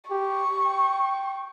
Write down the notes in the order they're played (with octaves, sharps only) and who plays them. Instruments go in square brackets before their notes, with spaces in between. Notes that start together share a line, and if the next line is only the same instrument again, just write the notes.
[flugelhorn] G4 [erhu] C#6
[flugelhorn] G5